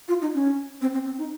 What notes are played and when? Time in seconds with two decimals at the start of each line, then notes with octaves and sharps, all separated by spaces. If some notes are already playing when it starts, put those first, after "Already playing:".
0.08 F4
0.22 D#4
0.34 C#4
0.82 C4
0.94 C4
1.06 C4
1.18 D#4